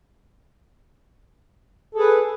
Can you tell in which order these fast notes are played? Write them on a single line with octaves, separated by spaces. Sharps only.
A4 G#4 B4